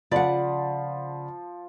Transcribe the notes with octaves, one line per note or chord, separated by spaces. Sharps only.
C#3 F3 D5 F#5 B5